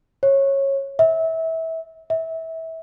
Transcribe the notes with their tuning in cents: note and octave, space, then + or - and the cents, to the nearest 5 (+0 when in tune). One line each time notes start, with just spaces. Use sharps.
C#5 -15
E5 -25
E5 -25